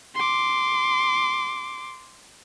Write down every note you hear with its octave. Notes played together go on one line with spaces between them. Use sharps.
C6 D6